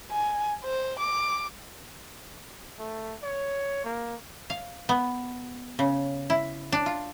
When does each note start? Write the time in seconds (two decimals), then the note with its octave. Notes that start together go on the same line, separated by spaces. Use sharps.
0.11 G#5
0.65 C5
1.00 D6
2.78 A3
3.23 C#5
3.84 A#3
4.50 F5
4.89 B3
5.79 C#3
6.30 E4
6.72 D4
6.86 F4